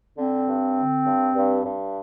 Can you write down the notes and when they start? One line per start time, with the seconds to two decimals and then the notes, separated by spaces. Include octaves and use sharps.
0.18 D3 C4
0.46 G2
0.77 D3
1.05 G2
1.35 G2
1.65 G2